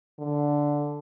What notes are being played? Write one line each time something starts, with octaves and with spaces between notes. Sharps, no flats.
D3